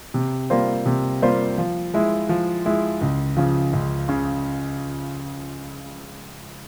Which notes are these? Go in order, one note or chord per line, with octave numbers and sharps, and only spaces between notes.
C3
G3 A#3 F4 C5
C3
G3 A#3 F4 C5
F3
G#3 E4
F3
G#3 E4
C#2
C#3 F3
C#2
C#3